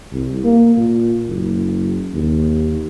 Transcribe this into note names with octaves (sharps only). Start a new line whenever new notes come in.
C2
A#3
A#2
F#1
D#2